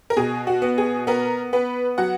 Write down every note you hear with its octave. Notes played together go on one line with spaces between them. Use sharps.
A#4
B2 G#4
F#4
B3
G#4
B3 A#4
B3 B4
F#3 F#5